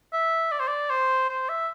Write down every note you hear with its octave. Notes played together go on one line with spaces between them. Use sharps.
E5
D5
C5
D5
C5
C5
E5